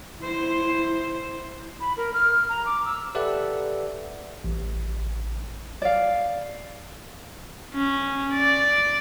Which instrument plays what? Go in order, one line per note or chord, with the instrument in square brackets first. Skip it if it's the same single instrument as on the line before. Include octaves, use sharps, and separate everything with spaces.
[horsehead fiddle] E4 C5
[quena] B5
A#4
F6
A#5
D6
E6
[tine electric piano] G4 A4 B4 D5 E5 F#5
A1
[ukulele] D5 F5
[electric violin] C#4
D5